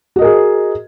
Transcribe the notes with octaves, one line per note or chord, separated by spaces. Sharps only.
F#4 G#4 A#4 D#5